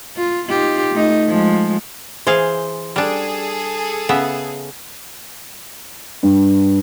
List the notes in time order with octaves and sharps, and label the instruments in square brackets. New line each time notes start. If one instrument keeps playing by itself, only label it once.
[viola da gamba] F4
D#4 F4 G4
A3 D#4
F3 G#3
[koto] E3 G#4 F5 [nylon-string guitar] C5
[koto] G3 D4 [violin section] G#4 A4
[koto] C#3 B3 E5
[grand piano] G2